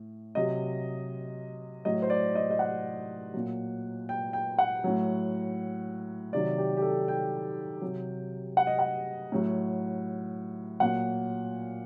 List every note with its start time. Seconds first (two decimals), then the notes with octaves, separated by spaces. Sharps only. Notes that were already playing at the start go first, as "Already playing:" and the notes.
Already playing: A2
0.35 C3 F#3 D#5
1.85 A2 F#3 D#5
2.02 C5
2.10 D5
2.35 D#5
2.50 D#5
2.59 F#5
3.34 A#2 F#3
4.09 G5
4.33 G5
4.58 F#5
4.84 A2 F#3
6.33 C3 D#3 F#3 D5
6.58 G4
6.77 G4
6.82 A4
7.08 G5
7.82 C3 F#3
8.57 F#5
8.67 D#5
8.79 F#5
9.32 A2 F#3
10.80 A#2 F#3 F#5